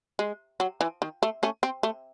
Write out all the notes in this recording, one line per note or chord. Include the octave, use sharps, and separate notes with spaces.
G#3
F#3
E3
D#3
A3
A3 C#4
C4
A3